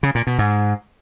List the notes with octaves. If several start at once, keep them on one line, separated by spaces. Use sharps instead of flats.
C#3
A#2
B2
G#2